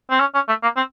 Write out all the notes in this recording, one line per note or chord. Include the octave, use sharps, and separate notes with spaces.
C4
C#4
C#4
A3
A#3
C4